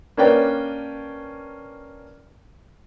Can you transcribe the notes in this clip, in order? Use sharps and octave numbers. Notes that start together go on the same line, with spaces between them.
A#3 C#4 D4 B4 D5 G5